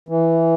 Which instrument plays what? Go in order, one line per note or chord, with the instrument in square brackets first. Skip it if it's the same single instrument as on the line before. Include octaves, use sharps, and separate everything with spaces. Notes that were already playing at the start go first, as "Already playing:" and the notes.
[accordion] E3